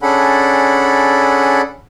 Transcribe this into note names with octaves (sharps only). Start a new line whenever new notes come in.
C#4 D4 G#4 A4 F#5 B5